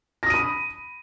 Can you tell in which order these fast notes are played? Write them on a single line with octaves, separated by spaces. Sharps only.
A#6 D#6 D#7 B5